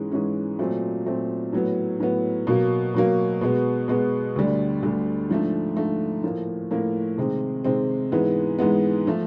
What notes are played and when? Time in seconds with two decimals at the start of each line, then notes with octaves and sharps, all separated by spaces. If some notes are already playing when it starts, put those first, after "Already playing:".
Already playing: G#2 E3 G#3 C#4
0.12 G#2 E3 G#3 C#4
0.59 A#2 F#3 A3 C4
1.06 A#2 F#3 A3 C4
1.53 A2 F#3 B3
2.00 A2 F#3 B3
2.47 B2 F#3 A#3
2.94 B2 F#3 A#3
3.41 B2 G#3 B3
3.88 B2 G#3 B3
4.36 D2 D3 G3
4.82 D2 D3 G3
5.30 G#2 F3 A3 D4
5.76 G#2 F3 A3 D4
6.23 A2 F3 A#3
6.71 A2 F3 A#3
7.18 C3 D#3 G#3 C4
7.65 C3 D#3 G#3 C4
8.12 G#2 E3 G#3 B3
8.59 G#2 E3 G#3 B3
9.07 F3 A3